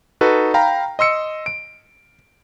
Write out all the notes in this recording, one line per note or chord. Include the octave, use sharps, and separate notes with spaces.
D#4 F#4 A4 B4
F5 G5 A#5 B5
D#5 C6 E6 C#7
D7